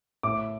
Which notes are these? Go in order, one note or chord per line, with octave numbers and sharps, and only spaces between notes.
A2 D6